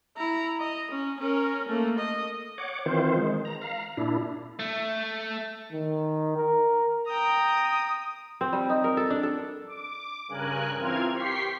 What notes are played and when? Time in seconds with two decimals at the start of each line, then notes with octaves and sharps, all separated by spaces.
0.17 E4 A#5
0.60 D#5 A#5
0.91 C#4
1.19 C#4 A#4
1.68 A3 A#3
1.99 D#5
2.58 C#5 F#5 D6
2.86 D#3 E3 C4 F4 C5
3.17 D#3 G#3
3.45 A#5
3.62 F5 A#5
3.97 A#2 D4 E4
4.59 A3
5.73 D#3
6.37 A#4
7.07 G5 A#5 D#6
8.41 C4
8.53 G3
8.69 D#4
8.84 A#4
8.97 A4
9.10 D4
9.23 A4
9.67 D6
10.28 G2 C#3 A#4 G#5 F#6
10.77 E3 C4 F4 A#4 F6 G#6
11.12 G4 C6 C#6 B6 C7